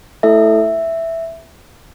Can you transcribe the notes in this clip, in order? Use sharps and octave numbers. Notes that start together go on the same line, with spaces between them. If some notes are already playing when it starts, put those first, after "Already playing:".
A3 E4 A4 E5